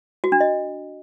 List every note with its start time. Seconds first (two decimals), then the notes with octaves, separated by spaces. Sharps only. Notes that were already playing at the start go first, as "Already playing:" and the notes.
0.24 F#4
0.32 D4
0.40 D#5